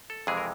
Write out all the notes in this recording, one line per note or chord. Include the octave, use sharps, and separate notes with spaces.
A4
F2 C3 E3 G#3 G#4
A#4